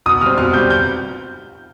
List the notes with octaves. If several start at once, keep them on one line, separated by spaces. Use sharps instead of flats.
B2 D#6
G3 C4 F6
B2 F6
G3 C4 G6
G6